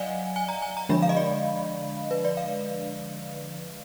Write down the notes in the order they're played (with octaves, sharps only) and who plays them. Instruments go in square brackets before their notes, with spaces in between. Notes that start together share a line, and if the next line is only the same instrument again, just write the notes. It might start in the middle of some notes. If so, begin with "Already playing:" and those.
Already playing: [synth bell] F#3 D5 D#5 F5 F#5 G#5
G#5
A#5
G#5
A#5
D3 F3 G#3 D4 B5
F5
D#5
D5
B4
D5
F5